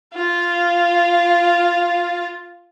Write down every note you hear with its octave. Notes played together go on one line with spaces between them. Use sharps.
F4 F5